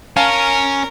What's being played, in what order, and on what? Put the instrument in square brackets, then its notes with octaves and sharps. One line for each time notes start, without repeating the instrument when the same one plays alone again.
[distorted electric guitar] C#4 [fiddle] A#4 [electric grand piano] F5 G#5 A5